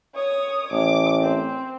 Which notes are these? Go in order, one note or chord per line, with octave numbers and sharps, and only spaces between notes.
C#5 D#6
A1 D6
C4